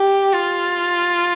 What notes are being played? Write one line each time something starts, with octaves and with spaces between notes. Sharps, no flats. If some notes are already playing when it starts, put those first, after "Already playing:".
Already playing: G4
F4